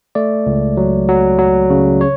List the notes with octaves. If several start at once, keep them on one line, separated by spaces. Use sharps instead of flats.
A3 D5
C#2
F#3
F#3
F#3
C#3
C#5